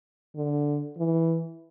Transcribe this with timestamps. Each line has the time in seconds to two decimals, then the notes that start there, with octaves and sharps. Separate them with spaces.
0.36 D3
0.98 E3